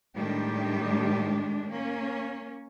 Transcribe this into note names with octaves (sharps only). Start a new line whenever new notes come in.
A2 D#3 G3 G#3 D4 G4
A#3 C#4